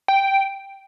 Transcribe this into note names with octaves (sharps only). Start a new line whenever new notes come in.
G5